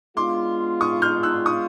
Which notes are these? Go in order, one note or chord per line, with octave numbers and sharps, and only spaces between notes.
G#3 B3 D4 F4 C6 D6
C#6 D#6
F6 G6
E6 F#6
C#6 D#6